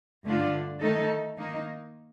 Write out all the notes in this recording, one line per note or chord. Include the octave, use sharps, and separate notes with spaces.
G2 D3 A3 D4 F4
D#3 A3 D#4 A4
D#3 A#3 D#4